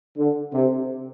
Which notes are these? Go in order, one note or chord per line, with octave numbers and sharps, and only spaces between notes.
D3
C3